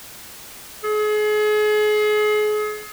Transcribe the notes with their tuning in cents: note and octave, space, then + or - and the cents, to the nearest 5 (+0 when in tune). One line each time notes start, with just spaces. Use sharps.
G#4 +35